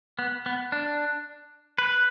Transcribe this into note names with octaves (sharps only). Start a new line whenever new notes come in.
B3
B3
D4
B4